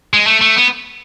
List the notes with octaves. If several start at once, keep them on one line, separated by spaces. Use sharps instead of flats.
G#3
A3
A3
B3